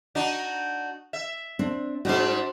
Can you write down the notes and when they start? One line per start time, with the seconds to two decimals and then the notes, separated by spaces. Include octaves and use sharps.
0.15 D4 D#4 F#4
1.13 E5
1.59 C4 D4
2.05 G#2 G3 D4 F#4 C5